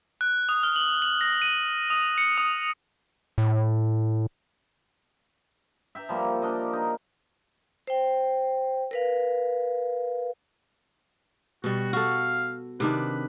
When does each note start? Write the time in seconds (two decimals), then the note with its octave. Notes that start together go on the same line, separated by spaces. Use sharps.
0.21 F#6
0.49 D#6
0.63 F6
0.76 F#7
1.02 F#7
1.21 A#6
1.42 D#7
1.90 D#6
2.18 C#7
2.38 D#6
3.38 A2
5.95 E5 G5 A#5
6.09 F3 G3 A#3
6.42 D4 A#4 D#5 D6
6.73 D#4
7.87 C5 G5
8.91 A#4 B4 F5
11.64 B2 G3 F#4
11.93 F#4 A4 F5
12.80 C3 D#3 D4 B4